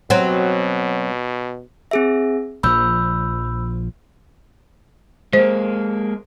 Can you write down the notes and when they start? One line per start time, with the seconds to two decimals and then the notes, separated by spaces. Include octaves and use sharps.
0.10 B2 F#3 C4
1.91 C4 G#4 E5
2.63 A#1 F3 B5 E6 G6
5.33 G#3 A#3 C5